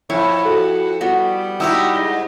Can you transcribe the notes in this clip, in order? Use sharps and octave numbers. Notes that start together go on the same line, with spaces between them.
F2 E4 C#5
F#4 A4
G3 B3 F#4
B3 D#4 E4 F#4 G4 E5 G5 E6
G#2 D#5 A#6 G7